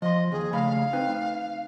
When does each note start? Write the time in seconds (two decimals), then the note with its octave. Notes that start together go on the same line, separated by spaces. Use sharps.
0.02 F3 D#5 C6
0.32 D#2 G#4
0.53 C#3 A3 F5 B5
0.93 C4 D#4 B4